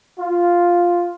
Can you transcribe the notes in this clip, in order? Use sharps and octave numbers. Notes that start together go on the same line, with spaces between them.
F4